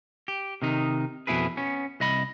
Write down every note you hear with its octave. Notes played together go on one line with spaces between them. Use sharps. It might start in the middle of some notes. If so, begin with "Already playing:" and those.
G4
C3 D#3 D#4
F2 B2 E4 G#4 B4
B3 C#4
C2 D#5 B5